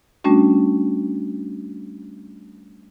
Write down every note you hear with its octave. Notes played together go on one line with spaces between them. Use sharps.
G3 A3 C#4 D4 F#4